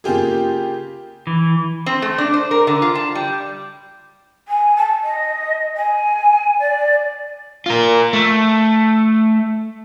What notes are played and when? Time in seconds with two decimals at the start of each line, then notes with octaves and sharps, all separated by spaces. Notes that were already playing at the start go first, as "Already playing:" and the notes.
0.04 C#3 A#3 F4 G4 G#4
1.27 E3
1.86 C4
2.02 A3
2.18 D4
2.34 C5
2.51 A#4
2.67 D3
2.82 F4
2.95 A5
3.15 G3
4.48 G#5
4.76 A5
5.03 D#5
5.76 G#5
6.59 D5
7.66 F4 A#4
8.13 A3